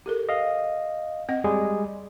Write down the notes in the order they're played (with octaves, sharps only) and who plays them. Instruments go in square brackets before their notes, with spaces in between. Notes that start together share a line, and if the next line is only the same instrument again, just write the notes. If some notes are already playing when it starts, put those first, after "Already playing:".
[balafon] G4 A4 A#4
[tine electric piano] D#5 F5
[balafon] C4 D#5 F#5
[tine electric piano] G3 G#3 G#4